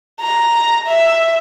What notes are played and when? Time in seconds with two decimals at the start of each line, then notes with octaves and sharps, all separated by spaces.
0.20 A#5
0.87 E5